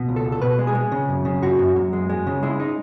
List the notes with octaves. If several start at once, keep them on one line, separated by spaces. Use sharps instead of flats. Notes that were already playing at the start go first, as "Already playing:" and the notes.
Already playing: B2
C#2
A4
C#2
A4
B2 B4
G#3
G#4
G#3
C#3
F#2
C#3
F#2 F#4
F#2
F#2
G#3
G#3
C#3
G#3 E4
D#4